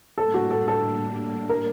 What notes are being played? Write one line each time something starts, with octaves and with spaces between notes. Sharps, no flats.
A2 G3 A#3 D4 A4
F#4
A4
A4
A#4